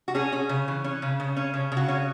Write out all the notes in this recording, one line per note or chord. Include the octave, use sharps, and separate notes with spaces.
F#4
C#4 G#4
C#4
C#3
E3
C#4
C#3
C#3
C#4
C#3
C#3
F#4
C#4